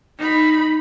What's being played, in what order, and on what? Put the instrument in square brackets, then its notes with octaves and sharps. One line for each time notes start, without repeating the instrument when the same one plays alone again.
[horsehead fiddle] D#4 B5